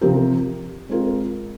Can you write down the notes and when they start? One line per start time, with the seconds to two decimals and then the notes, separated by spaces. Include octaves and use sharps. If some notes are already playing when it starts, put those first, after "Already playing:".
0.01 C3 F3 C4 G4 A#4
0.89 G#3 C4 F4 A#4